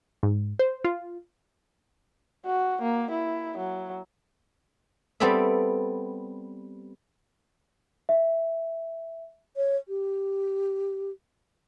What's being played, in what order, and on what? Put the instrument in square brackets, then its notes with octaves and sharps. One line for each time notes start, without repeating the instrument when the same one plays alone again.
[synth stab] G#2
C5
F4
[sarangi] F#4
A#3
E4
F#3
[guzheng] G3 B3 C4 A4 D5 E5
[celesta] E5
[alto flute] C#5
G4